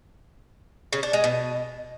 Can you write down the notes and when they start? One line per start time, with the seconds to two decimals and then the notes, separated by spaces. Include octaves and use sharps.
0.93 C#3
1.03 D4
1.13 G#3
1.24 B2